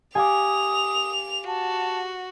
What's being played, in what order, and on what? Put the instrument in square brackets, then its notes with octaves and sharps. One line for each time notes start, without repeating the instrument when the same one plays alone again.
[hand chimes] G4 F5 D6 [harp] G#5 [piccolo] D#6 [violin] F7
[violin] F#4 [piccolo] A5